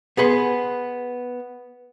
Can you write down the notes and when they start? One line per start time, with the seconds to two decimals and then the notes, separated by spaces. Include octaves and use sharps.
0.17 B3 G#4 B4 C6